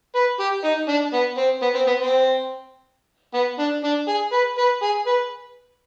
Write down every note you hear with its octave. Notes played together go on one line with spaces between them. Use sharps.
B4
G4
D#4
D4
B3
C4
B3
C4
B3
C4
B3
D4
D4
G#4
B4
B4
G#4
B4